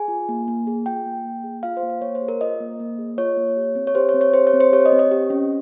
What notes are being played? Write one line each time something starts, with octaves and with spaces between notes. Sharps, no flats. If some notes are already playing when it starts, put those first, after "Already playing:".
Already playing: G#4 G#5
F4
A#3
A#3
G#4
F4 G5
A#3
A#3
G#4
F4 F5
C5
A#3
C5
A#3 C#5
C5
G#4
A#4
F4 D#5
A#3
A#3
G#4
F4 C#5
A#3
G4
C4
C#5
G4 C5
C#5
C4
C#5
G4 C5
C#5
C4
C5
G4 C#5
D#5
C4
D#5
G4
C#4